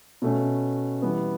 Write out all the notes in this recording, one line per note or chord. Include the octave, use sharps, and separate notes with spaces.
B2 A3 C#4
E3 G3 B3